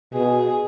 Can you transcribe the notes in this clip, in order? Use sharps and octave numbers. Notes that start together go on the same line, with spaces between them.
B2 G#4